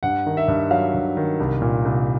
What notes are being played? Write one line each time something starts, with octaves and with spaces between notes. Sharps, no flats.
G2 F#5
D#3
E5
G2
F#3 F5
G2
D#3
C2
A#2
C2